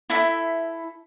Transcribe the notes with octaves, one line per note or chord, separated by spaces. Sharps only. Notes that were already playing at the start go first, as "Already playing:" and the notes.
E4 A4 E5